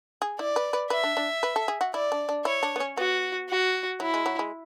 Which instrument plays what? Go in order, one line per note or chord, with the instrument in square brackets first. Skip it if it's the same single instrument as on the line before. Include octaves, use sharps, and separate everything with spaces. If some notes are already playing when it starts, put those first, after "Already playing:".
[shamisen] G#4
[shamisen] E4 [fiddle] D5
[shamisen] B4
B4
[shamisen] B4 [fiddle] E5
[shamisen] D4
D4
B4
A4
G#4
F#4
[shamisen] E4 [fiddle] D5
[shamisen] D4
D4
[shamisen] E4 [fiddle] C#5
[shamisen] D4
B3
C#4
[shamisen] B3 [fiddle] F#4
[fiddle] F#4
[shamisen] F#3 [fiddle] E4
[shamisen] G#3
F#3
G#3